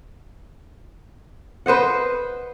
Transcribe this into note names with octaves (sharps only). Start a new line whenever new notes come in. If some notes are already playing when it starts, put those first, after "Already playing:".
B4 C5 D#5 F#5